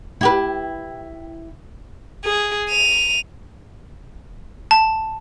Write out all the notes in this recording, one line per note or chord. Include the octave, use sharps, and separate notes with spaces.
E4 G4 B4
G#4
D#7 F7
A5